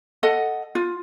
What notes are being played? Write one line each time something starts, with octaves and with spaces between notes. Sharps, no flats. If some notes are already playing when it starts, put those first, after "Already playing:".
A4 D#5 F#5
F4